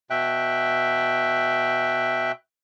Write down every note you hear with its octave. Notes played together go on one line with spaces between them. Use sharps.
B2 E5 G5 F#6